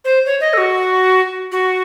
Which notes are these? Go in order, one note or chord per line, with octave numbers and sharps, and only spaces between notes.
C5
C#5
D#5
A4
F#4
F#4